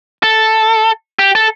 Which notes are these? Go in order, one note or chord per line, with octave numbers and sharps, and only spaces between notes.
A4
G4
A4